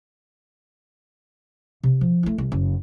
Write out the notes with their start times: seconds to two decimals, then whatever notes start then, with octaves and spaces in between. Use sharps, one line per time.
1.83 C3
2.01 F3
2.23 A3 E4
2.38 C2
2.52 F#1